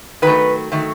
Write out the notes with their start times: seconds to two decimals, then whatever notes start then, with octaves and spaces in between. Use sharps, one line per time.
0.22 D#3 F#3 A3 B4
0.72 D#3 F#3 A3